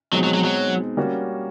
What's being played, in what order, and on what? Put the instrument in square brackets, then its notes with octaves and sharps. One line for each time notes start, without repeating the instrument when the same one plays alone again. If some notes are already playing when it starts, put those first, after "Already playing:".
[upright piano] B2 G#3 C4 D#4 [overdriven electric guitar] F#3
[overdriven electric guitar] F#3
F#3
F#3
[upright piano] G3 A#3 C#4 F#4